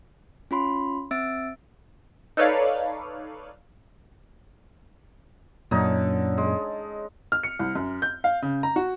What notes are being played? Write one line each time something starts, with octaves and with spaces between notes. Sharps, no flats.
C#4 F4 B5 C6
C4 E5 E6 A6 D7
D#4 A4 B4 C#5 D5 F5
F#2 A#2 D3 C#4 D#4
G#3
F6
C#7
C2
F#2
G6
F5
C#3
A#5
F#4